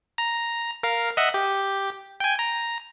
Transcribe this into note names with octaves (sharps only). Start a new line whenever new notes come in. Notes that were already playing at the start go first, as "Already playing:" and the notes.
A#5
A#4 F5
D#5 E5 F#5
G4
G5 G#5
A#5